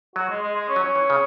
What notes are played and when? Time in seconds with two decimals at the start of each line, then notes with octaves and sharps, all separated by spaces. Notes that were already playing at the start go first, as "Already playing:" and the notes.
0.16 F#3 F#4
0.29 G#3
0.42 G#3
0.55 G#3
0.69 C#4
0.76 F#3
0.83 C#4
0.95 E3
1.10 C#3